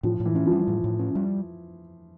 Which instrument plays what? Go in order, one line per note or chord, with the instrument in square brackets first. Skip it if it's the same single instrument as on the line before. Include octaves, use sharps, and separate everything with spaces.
[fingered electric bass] A2 [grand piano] F3
[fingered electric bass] A2
[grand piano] E3
[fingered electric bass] C#4
[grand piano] F3
[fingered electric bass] G3
A2
A2
C#4
G3